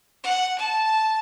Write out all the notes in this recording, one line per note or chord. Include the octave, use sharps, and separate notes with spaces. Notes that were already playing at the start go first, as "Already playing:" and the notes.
F#5
A5